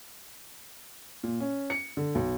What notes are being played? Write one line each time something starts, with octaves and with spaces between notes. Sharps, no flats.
A#2
C#4
C#7
D3
B1